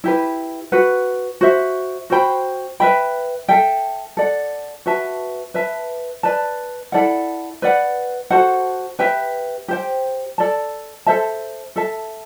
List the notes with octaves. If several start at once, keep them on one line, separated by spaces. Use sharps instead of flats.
E4 G4 B4
F#4 B4 F#5
F#4 C5 E5
F#4 C5 G5 B5
B4 E5 G5 B5
A4 E5 G5
A4 D5 F#5
F#4 B4 E5 A5
B4 E5 A5
B4 D5 A5
E4 A4 D5 F#5
B4 D5 F#5
F#4 A4 C5 F#5
G4 B4 E5 G5
G4 C5 G5
A4 D5 A5
A4 C5 E5 A5
A4 E5 A5